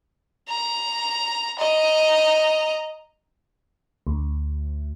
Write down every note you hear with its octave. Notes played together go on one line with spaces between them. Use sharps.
A#5
D#5 A#5
D2